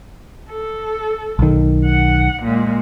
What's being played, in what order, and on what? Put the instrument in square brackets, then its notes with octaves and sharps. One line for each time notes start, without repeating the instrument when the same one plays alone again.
[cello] A4
[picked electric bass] B1 D#3
[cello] F#5
A#2 G#3